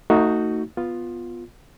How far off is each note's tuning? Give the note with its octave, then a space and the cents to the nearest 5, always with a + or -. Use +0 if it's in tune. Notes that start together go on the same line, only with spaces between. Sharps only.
A3 +35 D#4 +5 F#4 +0
B3 +0 F4 +5